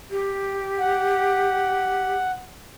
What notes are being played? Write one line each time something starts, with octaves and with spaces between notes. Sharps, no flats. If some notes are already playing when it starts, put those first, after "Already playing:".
G4
F#5